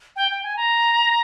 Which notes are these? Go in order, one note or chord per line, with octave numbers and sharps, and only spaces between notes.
G5
G5
G#5
A#5